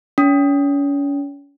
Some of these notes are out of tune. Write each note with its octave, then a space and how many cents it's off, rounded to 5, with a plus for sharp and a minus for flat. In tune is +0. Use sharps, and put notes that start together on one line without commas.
C#4 +35